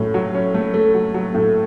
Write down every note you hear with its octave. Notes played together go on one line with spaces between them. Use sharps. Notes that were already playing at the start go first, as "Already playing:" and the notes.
Already playing: A2 F#3 C#4
F#3
C#4
A3
A3
F#3
F#3
A2